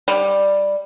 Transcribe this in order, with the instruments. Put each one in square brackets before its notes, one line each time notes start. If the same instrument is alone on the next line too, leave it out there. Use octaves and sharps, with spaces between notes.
[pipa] G3